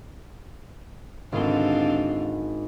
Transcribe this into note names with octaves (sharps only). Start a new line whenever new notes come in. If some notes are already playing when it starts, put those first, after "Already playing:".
G#1 D3 C4 F4